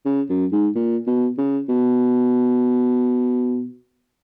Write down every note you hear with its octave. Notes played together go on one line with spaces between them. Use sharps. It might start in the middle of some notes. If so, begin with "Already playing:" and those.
C#3
F#2
G#2
A#2
B2
C#3
B2